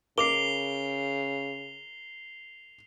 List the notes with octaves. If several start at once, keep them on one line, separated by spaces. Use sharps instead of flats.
C#3 A#4 D6 C7 F7 G7